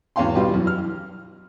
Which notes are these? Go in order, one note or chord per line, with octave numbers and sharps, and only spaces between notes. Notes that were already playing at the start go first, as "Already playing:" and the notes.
G#1 E2 C#4 F5 G5 C6
B2 G3 F4 G4
F#2 E3
F6